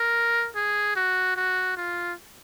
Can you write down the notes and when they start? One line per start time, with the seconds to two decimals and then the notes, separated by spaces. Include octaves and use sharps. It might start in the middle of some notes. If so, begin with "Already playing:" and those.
Already playing: A#4
0.56 G#4
0.96 F#4
1.36 F#4
1.77 F4